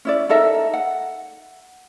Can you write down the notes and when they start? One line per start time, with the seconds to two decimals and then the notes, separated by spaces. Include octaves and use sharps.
0.05 C#4 E4 D5
0.29 D#4 A4 A#4 E5
0.73 F#5